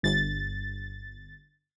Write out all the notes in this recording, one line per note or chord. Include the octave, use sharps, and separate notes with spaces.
G1 A6